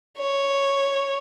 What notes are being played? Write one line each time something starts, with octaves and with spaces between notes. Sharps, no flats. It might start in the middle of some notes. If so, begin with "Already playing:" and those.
C#5